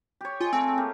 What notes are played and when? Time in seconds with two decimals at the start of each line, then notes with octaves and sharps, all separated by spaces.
0.21 G4 C#5
0.40 F4 G#4 D#5
0.53 A3 C4 F4 G#5
0.77 A#3 G4 G#4